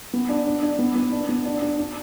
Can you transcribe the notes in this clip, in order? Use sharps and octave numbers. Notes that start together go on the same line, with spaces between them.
B3
D4
D4
D4
B3
B3
D4
B3
D4
D4
D4